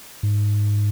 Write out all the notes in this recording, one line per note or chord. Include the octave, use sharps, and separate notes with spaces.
G#2